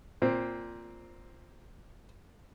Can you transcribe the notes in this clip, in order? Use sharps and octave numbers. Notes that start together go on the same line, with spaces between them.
A#2 C4